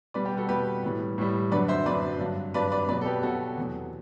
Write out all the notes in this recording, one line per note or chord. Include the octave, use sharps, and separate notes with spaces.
B2 G3 B4 D5
G4 B4
F#4 A4
B2 G3 G4 B4
A2 E3 G3
A2 E3 G3
F#2 D3 F#3 B4 D5
C5 E5
F#2 D3 F#3 B4 D5
G2 F#3
G2 F#3 B4 D5
B4 D5
B2 F#3 B4 D5
A4
G4 B4
B2 F#3 F#4 A4
E2 C3 F#3